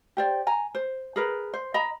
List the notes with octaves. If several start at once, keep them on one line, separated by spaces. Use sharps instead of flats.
G4 C5 D5
G#5 A#5
C5
G#4 A#4 B4
C5
D#5 A#5 B5